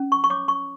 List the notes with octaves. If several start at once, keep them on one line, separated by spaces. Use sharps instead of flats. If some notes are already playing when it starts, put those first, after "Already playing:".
Already playing: C#4
C#6
C#6
C#5 D6
C#6